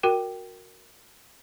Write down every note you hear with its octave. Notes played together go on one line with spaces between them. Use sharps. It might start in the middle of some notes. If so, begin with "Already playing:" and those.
F#4 A#4 G5